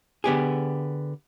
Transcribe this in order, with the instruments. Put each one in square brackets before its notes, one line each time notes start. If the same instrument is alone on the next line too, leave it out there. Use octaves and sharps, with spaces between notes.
[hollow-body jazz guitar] D3 B3 G4 G#4